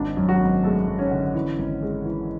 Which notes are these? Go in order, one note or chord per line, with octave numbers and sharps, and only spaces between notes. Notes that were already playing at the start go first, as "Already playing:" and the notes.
Already playing: G#1 D4
F#2
F#3 F#4
G#1
G#3 A3 A4
F#2
C#4 C#5
D3
E3
G#1
G#3
E3